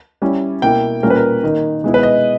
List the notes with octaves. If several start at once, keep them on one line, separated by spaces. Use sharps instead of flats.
G3 C#4 E4
B2 A#3 E4 G5
A#2 G3 C#4 A#4
B4
A#4
D#3 A#3 D#4
B2 G#3 B3 E4
B4
D#5